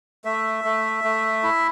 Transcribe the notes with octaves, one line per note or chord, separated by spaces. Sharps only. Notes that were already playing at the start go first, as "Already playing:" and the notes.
A3 E5
A3
A3
E4